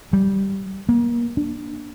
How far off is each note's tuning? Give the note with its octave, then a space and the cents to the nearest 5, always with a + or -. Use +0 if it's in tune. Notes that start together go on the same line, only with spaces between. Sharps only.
G3 -10
A#3 +30
D4 +10